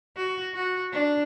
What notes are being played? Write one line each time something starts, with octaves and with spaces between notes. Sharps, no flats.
F#4
F#4
D4